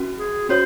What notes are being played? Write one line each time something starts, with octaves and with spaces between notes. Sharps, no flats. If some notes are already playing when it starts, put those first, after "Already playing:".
Already playing: C#4 F#4
G#4
C#4 F#4 C5 C#5